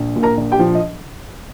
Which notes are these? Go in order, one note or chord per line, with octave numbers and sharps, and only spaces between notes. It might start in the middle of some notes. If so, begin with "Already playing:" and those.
Already playing: A#1
A#2
A#4 A#5
A#1
G4 G5
F3
D#5